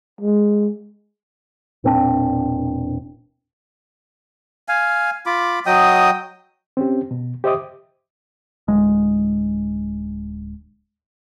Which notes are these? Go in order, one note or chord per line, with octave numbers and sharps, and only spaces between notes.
G#3
E1 A#2 C4 D4
F5 G#5
F4 B5 D6
F#3 D#5 G5 D#6
C4 C#4 G4
B2
G4 C5 D#5 E5 D6 D#6
D1 G#3